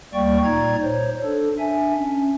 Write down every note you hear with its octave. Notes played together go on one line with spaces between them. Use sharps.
D2 G3 A#3 D5 G5 C#6
A#2 D#4 D5 A#5 G#6
C5 C#5
D4 A4
D4 E5 G#5
C#4